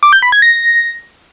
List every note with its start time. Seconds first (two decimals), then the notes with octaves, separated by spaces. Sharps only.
0.03 D6
0.13 G6
0.22 B5
0.32 G#6
0.42 A#6